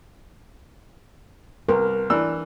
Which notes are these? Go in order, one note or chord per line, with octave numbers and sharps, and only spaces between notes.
C2 A#4 B4
E3 D4 E6